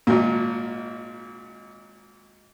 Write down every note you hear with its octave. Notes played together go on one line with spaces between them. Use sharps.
G#1 A#2